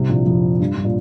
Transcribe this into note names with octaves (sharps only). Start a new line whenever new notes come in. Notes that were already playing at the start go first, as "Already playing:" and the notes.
Already playing: C2 C3
A#1 A#2
F2
G2
G2
A#2